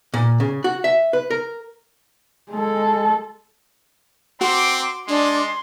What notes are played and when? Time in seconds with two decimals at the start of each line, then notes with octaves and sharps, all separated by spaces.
0.14 A#2
0.40 C#3
0.64 F#4
0.84 E5
1.13 B4
1.31 A#4
2.51 G#3 A4
4.41 C4 F#4 C6 D6
5.08 G#3 D4 C6